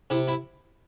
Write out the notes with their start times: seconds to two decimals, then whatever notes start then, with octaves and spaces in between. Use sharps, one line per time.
0.10 C3 E4
0.28 E4